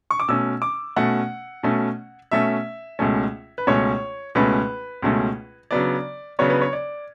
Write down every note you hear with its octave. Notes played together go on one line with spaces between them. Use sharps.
C#6
D6
B2 A3 C#4 E6
D6
B2 A3 C#4 F#5
B2 A3 C#4
B2 A3 C#4 E5
C#2 B2 A3 C#4
B4
C#2 B2 A3 C#4 C#5
C#2 B2 A3 C#4 B4
C#2 B2 A3 C#4
C#3 F#3 B3 D4 D5
C#3 F#3 B3 D4 C#5
B4
C#5
D5